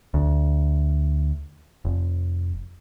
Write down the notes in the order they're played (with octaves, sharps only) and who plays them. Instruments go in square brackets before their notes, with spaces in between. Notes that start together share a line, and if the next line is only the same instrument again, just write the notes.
[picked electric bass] D2
F1